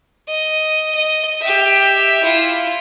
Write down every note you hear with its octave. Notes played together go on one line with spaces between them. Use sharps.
D#5
D#5
G4 E5
E4 F4